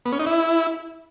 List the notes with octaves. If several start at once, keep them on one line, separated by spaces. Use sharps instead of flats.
B3
C#4
D#4
E4